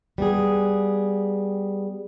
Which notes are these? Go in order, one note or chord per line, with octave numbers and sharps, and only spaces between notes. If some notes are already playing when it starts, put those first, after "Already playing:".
G3 B3 G4 G#4